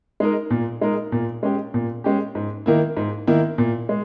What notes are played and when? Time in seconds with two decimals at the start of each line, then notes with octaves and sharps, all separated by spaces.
0.20 G#3 D#4 A#4
0.50 A#2
0.81 G#3 D#4 A#4
1.12 A#2
1.43 G#3 C#4 G4
1.74 A#2
2.04 G#3 C#4 G4
2.35 G#2
2.66 D#3 A#3 E4
2.97 G#2
3.27 D#3 A#3 E4
3.58 A#2
3.89 G#3